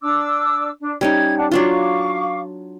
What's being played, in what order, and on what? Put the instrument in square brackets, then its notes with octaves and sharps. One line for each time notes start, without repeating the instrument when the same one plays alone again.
[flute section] D4 D6 E6
D4
[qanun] G3 C#4 D#4 [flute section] G#6
[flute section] D4 F#5 A5
[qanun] F#3 D4 F4 [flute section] F5 C#6 D6